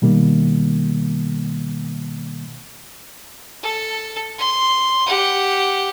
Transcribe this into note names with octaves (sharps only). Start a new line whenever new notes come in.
B2 D#3 G3 A#3
A4
C6
G4 F#5